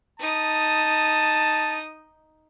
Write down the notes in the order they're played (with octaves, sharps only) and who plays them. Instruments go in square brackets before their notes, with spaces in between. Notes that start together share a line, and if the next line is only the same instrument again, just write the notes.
[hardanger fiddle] D#4 D#6 [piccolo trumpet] A5